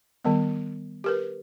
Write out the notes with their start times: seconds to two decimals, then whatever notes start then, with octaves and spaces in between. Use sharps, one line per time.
0.25 D#3 G3 B3
1.04 G4 A#4 B4